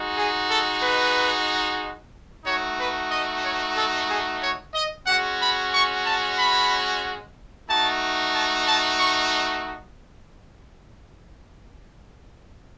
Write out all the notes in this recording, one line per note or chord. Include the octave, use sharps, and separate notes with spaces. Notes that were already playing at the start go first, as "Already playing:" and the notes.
Already playing: G#3 D#4 F#4
G#4
A4
B4
A3 D#4 F#4 C#5
B4
D#5
C#5
A4
G#4
C#5
D#5
G#3 C#4 F#4 F#5
B5
C#6
A5
B5
A3 D#4 F#4 A5
A5
A5
C#6